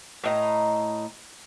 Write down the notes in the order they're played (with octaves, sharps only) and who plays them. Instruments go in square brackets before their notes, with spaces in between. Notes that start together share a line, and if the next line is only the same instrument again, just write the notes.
[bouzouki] A2 D#5 A#5